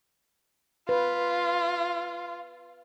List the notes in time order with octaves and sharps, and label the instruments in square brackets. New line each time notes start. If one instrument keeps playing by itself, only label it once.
[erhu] F4 [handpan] B4